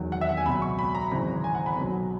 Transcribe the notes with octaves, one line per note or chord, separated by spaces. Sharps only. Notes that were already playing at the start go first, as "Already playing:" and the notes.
Already playing: E1 E2 D#3 F#3
F#5
E5
F#5
G#5
C#2 B2 F#3 B5
C#6
B5
A#5
G#1 F#2 C#3 E3 A#5
G#5
F#5
B5
B1 B2 F#3